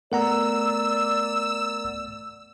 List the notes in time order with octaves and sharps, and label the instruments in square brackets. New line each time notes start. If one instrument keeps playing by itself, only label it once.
[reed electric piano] A3 B3 [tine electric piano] A#4 F#5 A#5 [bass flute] D5 [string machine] E6